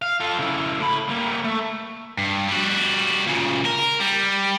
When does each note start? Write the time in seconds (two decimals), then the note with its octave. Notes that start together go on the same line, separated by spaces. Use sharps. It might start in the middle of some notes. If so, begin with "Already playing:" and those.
0.02 F5
0.20 F4 A4
0.39 C#3 E4
0.79 A2 B5
1.09 G3 A#3
1.44 A3
2.18 G2
2.48 G3 F#4
3.27 A#2 C#3
3.66 A#4
4.00 G3